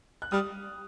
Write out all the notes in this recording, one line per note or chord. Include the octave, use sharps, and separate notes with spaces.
F#6
G3 D#6 F6